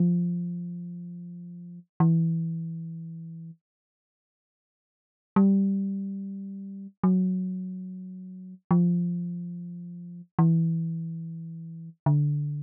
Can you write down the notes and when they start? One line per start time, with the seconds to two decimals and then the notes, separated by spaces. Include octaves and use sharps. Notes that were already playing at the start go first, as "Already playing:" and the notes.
Already playing: F3
2.00 E3
5.36 G3
7.04 F#3
8.71 F3
10.39 E3
12.06 D3